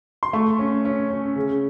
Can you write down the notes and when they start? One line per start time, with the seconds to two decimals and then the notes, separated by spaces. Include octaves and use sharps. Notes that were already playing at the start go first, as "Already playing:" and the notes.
0.23 C6
0.33 A3 C#6
0.59 C#4
0.85 C#4
1.10 C#4
1.36 C#3